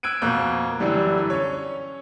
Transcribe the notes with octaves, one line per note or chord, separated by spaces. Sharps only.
E6 F#6 G#6 D7 D#7
F2 B2 A#3 F#6 G6
F#2 D3 E3 G3
C#4 C#5